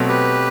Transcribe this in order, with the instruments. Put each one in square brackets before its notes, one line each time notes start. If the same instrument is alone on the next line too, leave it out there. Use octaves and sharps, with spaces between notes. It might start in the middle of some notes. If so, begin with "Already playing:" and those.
Already playing: [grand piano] B2 F#3 A3 C4
[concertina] G4 B4